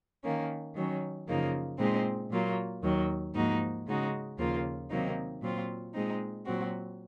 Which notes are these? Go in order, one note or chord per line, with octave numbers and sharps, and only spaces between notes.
D#3 A#3 C#4
D#3 F#3 C#4
F#2 C#3 F3 A#3 D#4
A#2 G#3 C4 D#4
A#2 F#3 A#3 F4
D#2 D#3 F#3
G#2 F3 A#3 D#4 F#4
C#3 G#3 D#4 F#4
D#2 C#3 F3 A#3 F4
C3 D#3 F#3 A#3 D#4
A#2 F#3 C4 F4
A#2 G#3 C4 D#4
A#2 F#3 C4 F#4